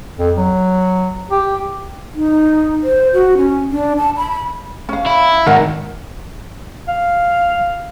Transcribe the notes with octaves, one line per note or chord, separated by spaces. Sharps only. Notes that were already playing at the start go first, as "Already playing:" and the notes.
F2
F#3
G4
D#4
C5
F#4
C#4
D4
A5
B5
C#4 F5
E4
G#2 D#3 A#4 D#5 F#5
F5